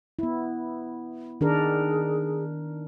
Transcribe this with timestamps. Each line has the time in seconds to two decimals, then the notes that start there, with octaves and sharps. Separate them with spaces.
0.19 B3 E4
1.41 D#3 D4 G#4 A#4